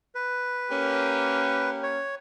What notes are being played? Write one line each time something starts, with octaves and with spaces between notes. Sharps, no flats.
B4
A#3 C#4 G4
C#5